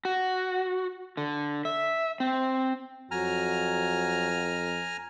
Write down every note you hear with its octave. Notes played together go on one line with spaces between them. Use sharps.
F#4
D3
E5
C4
F2 F#3 F#4 G#5 A#5 F6